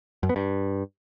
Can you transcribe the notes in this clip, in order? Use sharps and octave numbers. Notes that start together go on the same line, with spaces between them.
F#2
B3
G2